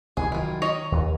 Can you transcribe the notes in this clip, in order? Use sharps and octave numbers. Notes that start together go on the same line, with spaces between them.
C2 E3 G#4
D#3 F#3 E4 F4
C#5 D#5 A#5
D#2